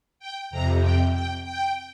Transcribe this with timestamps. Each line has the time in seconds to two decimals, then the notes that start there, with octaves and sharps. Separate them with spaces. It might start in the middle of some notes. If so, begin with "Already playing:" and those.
0.19 G5
0.51 F2 C3 A#5
0.82 G5
1.13 G5
1.44 G5